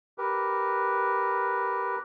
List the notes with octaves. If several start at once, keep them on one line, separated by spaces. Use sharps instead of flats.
G4 A#4 B4